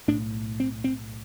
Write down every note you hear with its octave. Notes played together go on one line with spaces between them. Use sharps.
B1 A2 D4
C4
C4